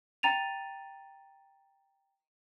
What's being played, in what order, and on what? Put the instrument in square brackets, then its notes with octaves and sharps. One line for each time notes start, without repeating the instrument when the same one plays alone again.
[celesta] G5 A#5 A6 D#7 F7